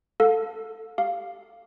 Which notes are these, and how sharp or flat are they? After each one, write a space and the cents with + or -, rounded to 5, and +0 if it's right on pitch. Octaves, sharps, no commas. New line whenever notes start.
A4 +10 F5 +35
G4 +5 F5 +0